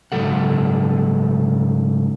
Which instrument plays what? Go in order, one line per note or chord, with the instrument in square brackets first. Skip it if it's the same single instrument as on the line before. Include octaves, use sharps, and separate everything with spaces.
[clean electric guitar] G#2 C#3 F#3 A4 F#5